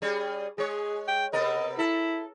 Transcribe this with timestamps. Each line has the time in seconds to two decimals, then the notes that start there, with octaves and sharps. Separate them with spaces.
0.02 G3 C#4 G#4
0.58 G#3 G#4 C#5
1.08 G5
1.33 C3 B3 A#4 D#5
1.79 E4 A4